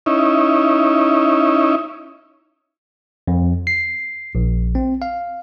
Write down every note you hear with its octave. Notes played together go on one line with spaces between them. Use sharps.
C#4 D#4 E4
F2
C7
A#1
C4
F5